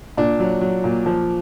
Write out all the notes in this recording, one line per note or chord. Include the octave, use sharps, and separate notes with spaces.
A#2 D4
F#3
F#3
A#2
F3